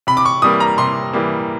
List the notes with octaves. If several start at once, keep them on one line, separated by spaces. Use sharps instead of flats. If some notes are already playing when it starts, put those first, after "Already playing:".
C3 B5
D6
C#6
E3 G3 A#3 D#6
A#5
C3 C6
E3 G3 A#3